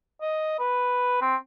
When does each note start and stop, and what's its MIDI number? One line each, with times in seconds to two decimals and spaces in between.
0.21 0.56 75
0.59 1.21 71
1.21 1.36 60